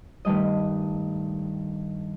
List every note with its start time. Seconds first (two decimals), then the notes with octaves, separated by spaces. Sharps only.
0.25 G2 D#3 G3 A3 D#5